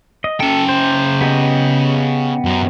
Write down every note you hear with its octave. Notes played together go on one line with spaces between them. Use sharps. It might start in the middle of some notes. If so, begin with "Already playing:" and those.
D#5
C#3 A4 G5
C5
B3 G4 D#5
F#2